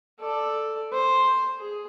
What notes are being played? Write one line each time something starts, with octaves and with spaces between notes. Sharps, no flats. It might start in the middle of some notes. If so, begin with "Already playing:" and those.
A4 D5
C5
G#4